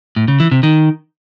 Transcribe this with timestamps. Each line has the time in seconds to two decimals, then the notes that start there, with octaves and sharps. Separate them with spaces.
0.16 A2
0.28 C#3
0.40 E3
0.51 C3
0.63 D#3